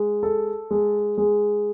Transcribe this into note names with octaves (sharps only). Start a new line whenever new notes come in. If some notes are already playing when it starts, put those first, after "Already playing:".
Already playing: G#3
A4
G#3
G#3